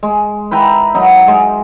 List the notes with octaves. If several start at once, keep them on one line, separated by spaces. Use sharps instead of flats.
G#3
B4 E5 G5 A#5
F#3 D#4
G#3